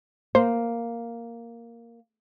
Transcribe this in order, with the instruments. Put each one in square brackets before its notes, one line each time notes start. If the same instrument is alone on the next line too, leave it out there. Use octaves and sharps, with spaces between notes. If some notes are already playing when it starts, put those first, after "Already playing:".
[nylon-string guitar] A#3 [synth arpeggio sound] C5